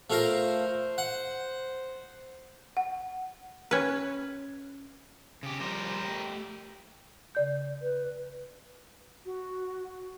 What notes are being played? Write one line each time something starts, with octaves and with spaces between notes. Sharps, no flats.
A3 F4 A#4 C5
F#5
F#5
C#4 B4
C#3 G4
F3 G3 A#4 C5
A3 G4
C#3 D5 G6
B4
F#4